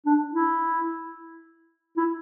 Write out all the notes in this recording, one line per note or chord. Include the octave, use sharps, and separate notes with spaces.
D4
E4
E4